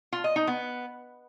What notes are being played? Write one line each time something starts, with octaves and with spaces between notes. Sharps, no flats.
F4
D#5
D#4
B3